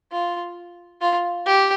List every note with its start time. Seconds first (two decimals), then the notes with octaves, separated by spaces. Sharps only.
0.12 F4
1.01 F4
1.46 G4